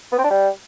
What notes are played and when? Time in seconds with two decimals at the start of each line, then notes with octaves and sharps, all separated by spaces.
0.12 B3
0.18 C4
0.24 D4
0.30 G3